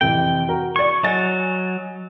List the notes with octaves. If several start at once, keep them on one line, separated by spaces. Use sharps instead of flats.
F2 C3 E3 G5
F#4 A#4 A#5
D5 C#6 G#6
F#3 D#5 G#5 A6